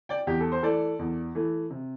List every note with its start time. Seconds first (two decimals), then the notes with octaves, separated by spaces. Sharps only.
0.09 D5 G5
0.27 E2 G4
0.40 A4
0.52 C5
0.62 E3 A3 A4 D5
0.99 E2
1.35 E3 A3
1.70 C3